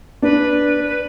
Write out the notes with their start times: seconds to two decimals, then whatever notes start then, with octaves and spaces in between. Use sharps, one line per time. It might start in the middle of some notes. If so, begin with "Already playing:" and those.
0.22 D4 B4
0.86 B4